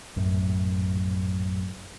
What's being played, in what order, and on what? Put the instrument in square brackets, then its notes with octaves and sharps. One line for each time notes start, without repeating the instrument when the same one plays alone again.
[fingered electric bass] A#1 F#2 A2